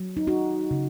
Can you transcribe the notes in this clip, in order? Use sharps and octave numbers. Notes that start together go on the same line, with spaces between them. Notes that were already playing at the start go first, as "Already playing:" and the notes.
Already playing: F#3
D#4
D#4 F#4
C#3